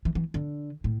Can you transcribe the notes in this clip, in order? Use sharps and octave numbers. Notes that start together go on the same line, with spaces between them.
E3
E3
D3
A2